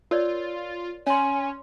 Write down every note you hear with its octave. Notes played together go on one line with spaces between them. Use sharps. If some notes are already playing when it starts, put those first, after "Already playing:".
F4 A#4 C#5 D5
C#4 C#5 G#5 C6